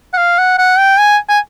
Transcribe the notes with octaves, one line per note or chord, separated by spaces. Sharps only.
F#5
F5
F#5
F#5
G5
G#5
G#5